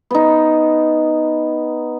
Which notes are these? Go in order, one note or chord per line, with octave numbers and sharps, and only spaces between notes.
B3 D#4